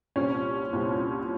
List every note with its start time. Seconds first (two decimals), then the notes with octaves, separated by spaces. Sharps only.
0.16 C2 A#2 G3 C4 C#4
0.72 C2 A#2 G3 C4